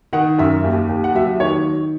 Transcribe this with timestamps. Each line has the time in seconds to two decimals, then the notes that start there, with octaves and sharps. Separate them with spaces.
0.13 D#3 F#5
0.39 F#2 E5
0.64 D#2
0.89 D#2
1.04 F#5
1.15 F#3 E5
1.40 D#3 C#5